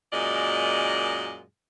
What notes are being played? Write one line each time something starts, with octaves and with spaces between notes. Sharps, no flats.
F#2 A#2 G#3 D5 D#5